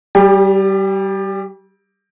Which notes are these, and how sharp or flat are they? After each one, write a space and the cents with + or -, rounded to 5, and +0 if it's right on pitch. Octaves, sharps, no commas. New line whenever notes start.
G3 -20 G4 +30